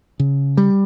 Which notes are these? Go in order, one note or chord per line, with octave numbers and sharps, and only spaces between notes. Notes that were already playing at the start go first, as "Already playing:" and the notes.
C#3
G3